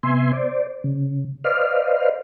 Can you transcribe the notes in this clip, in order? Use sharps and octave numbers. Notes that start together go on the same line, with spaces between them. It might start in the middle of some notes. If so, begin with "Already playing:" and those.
C3 B3 E5 G#5 C6
C5 D5
C#3
B4 C5 D5 D#5 F5 F6